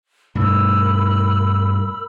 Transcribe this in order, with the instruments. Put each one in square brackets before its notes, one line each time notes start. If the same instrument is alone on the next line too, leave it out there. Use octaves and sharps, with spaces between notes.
[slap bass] G2 B2 A3 [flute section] A#4 B5 E6